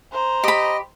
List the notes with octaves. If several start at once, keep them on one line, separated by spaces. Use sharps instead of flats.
C5 A#5
G4 D#5 B5